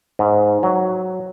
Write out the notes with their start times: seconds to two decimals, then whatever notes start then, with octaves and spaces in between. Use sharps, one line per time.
0.19 G#2
0.63 F#3